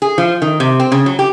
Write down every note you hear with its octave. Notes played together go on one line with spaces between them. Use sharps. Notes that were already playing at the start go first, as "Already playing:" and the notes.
G#4
F3
D#3
C3
C4
C#3
F#3
G4